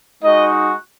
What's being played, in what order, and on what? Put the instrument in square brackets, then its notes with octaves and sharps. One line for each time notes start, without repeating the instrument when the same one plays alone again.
[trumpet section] G#3 D#4 F#4 D#5